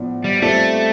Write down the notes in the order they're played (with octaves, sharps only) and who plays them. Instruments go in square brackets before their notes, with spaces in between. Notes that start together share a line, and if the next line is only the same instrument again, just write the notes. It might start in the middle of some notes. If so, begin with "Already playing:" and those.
Already playing: [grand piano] A2 F3 B3 D4
[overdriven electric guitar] G3
[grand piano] G3 C4 F4 A4 D5 [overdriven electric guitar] A3